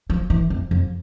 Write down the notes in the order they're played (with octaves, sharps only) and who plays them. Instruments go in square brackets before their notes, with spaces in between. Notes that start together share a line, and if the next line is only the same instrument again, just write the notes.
[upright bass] F3
E3
F2
F2